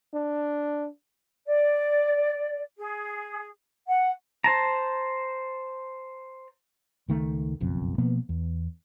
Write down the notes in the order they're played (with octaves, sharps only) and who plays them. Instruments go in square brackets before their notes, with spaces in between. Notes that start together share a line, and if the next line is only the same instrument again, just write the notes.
[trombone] D4
[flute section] D5
G#4
F#5
[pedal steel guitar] C5 A5 A#5
[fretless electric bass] C#2 D#3 A3
F#1 B1 F2
B2 F3 A#3 B3
E2